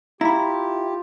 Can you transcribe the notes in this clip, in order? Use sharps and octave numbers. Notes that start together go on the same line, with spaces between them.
E4 F4 G4 A#5 B5